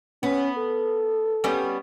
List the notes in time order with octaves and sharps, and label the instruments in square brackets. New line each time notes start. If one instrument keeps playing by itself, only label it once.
[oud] B3 [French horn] C#4
[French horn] A4
[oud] G3 B3 C#4